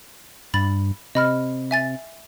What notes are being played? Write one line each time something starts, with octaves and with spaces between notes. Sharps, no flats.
G2 B5 A6 F#7
C3 D#5 B5 F6
E5 G#5 A6